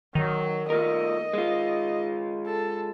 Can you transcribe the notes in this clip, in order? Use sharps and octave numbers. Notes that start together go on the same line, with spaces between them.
D#3 F#3
A3 F4 A#4 D#5
G#3 F4
A4